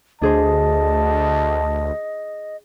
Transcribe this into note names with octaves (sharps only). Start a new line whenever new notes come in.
D2 D4 G#4 C5 D#5 A5